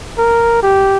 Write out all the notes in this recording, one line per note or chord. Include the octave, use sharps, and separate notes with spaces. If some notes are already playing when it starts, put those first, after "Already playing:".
A#4
G4